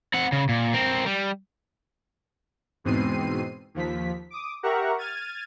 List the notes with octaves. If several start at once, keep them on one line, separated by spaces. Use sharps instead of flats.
C4 F#5
C#3
A#2
C4 A#4
G3
E2 G#2 B2 C4 C7 D#7
D#2 F3 B6
D6 D#6
G4 A#4 E5 F#5 A#5 C#6
F6 G#6 A6 D#7